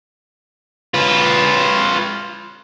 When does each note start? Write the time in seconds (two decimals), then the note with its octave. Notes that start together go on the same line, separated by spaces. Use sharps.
0.94 F4 B4